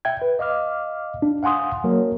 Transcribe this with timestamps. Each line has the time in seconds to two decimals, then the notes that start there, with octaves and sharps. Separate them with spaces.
0.05 E5 G5 G#6
0.22 B4
0.39 D#5 F5 D6 F6
1.22 D4
1.43 F5 F#5 G#5 C6 D#6
1.84 F#3 A#3 A#4